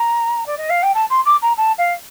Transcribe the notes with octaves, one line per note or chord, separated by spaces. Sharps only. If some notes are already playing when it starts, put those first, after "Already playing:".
Already playing: A#5
D5
D#5
F5
G5
A5
C6
D6
A#5
A5
F5